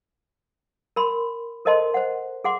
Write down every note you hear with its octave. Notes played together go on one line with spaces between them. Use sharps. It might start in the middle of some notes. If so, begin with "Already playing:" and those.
A#4 B5 C6
A4 A#4 C5 D#5 A5 C6
C5 F#5
G#4 F#5 C6 D6